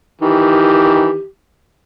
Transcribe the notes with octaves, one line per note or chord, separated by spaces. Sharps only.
D#3 E3 G4